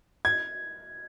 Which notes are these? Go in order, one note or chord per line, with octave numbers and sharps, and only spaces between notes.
G#6